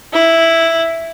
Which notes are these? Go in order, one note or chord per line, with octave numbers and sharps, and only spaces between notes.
E4